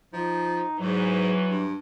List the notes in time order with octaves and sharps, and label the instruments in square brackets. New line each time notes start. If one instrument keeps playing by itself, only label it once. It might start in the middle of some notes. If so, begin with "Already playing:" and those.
[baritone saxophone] F3 [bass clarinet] D#4
[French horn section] E2 E3 B4 [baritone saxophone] G#2 [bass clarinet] F#3
[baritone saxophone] G2